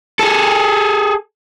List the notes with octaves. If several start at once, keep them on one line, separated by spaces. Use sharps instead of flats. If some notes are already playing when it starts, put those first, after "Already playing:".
G#4 A4